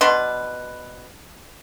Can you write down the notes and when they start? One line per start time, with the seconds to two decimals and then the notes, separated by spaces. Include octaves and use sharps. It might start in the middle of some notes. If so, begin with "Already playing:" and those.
0.01 B2 D4 B4 C6